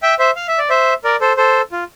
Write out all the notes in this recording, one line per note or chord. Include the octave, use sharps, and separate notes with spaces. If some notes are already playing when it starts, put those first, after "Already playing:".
E5 G5
C5 E5
F5
E5
D5
C5 E5
A#4 D5
A4 C5
A4 C5
F4